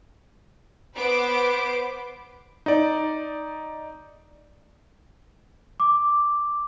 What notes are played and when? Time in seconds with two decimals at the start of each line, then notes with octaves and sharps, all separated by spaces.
0.96 B3 B4 C5 D6 D7
2.66 D#4 D5
5.80 D6